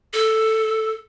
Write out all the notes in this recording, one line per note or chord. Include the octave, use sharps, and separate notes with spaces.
A4